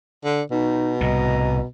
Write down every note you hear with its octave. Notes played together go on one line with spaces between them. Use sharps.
D3
B2 D#4
C2 A2 D#5 A#5